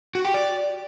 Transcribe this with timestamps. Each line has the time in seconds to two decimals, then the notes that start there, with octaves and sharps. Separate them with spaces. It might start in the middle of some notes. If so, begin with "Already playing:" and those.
0.15 F#4
0.25 G4
0.34 D5